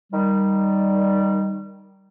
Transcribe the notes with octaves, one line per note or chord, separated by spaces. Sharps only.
D#3 G3